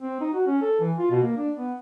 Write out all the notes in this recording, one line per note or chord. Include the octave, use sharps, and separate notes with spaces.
C4
D#4
F#4
C#4
A4
E3
F4
B2
A#3
D4
B3